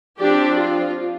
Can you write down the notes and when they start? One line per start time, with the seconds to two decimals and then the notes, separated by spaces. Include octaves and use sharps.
0.19 F3 C4 D4 G4
0.57 F4